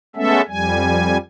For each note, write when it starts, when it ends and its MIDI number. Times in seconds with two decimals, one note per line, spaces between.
0.16 0.41 56
0.16 0.41 57
0.16 0.41 59
0.16 0.41 61
0.16 0.41 69
0.16 0.41 76
0.49 1.18 41
0.49 1.18 55
0.49 1.18 80